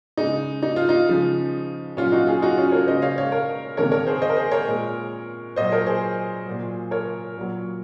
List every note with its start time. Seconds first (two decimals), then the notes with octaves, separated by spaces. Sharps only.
0.17 C#3 G#3 D#4
0.63 D#4
0.76 F4
0.89 D#4
1.08 C#3 F3 G#3
1.97 A#2 F#3 C#4 F4
2.12 D#4 F#4
2.27 F4 G#4
2.42 D#4 F#4
2.57 C#4 F4
2.72 A#4 C#5
2.87 C#3 G#3 C5 D#5
3.02 C#5 F5
3.17 C#5 F5
3.32 A#4 C#5
3.77 C3 D#3 G#3 A#4 C#5
3.92 A#4 C#5
4.07 G#4 C5
4.22 C5 D#5
4.30 A#4
4.37 G#4 C5
4.52 A#4 C#5
4.67 A#2 G#3
5.56 A#2 F#3 C5 D#5
5.72 A#4 C#5
5.86 G#4 C5
6.46 A#2 F#3
6.91 A#4 C#5
7.37 A#2 F#3